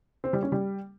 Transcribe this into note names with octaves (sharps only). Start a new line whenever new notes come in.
C4
G3
C#4
G3